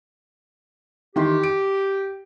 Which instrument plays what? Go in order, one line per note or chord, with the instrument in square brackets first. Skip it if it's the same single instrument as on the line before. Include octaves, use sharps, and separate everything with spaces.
[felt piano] D#3 E3 C6 [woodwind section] G4
[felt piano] D7